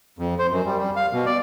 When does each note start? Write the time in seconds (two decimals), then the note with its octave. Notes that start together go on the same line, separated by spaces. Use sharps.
0.19 F2
0.39 C5
0.51 F#2
0.66 G3
0.78 G3
0.96 F5
1.13 B2
1.26 D5